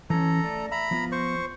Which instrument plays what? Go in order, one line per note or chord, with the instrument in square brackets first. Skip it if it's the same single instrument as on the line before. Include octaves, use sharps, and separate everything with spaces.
[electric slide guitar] E3 C#4 [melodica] A4 A#5
[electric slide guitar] A3 D5 A5
[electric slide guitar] E5 [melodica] A#5 B5
[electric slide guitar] F3 B3 F4
[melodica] C5 C#6